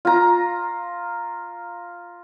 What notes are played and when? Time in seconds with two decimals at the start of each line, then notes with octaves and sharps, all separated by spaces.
0.05 F4 A#5